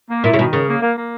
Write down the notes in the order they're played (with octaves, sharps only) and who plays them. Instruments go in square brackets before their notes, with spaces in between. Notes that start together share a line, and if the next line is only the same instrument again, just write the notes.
[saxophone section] A#3
[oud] A#2 [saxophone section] E4
[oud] C#3
[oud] B2 [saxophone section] D#3
[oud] C#3 [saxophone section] A#4
[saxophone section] A#3
A#3
A#3